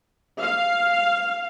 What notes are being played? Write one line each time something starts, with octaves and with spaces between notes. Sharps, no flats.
F5